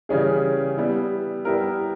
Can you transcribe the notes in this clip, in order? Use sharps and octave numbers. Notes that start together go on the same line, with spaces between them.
C#3 E3 G3 C#4 G#4
G3 B3 E4
G3 B3 E4 G4 A#4